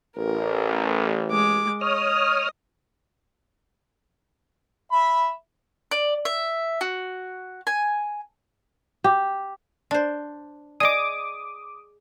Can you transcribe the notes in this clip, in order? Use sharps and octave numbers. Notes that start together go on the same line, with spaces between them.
A1 A#4
G#3 D6
C#5 D#5 D#6 F6
E5 B5
D5
E5
F#4
G#5
G4
D4 C5 D5
G#4 D5 D#5 D6 D#6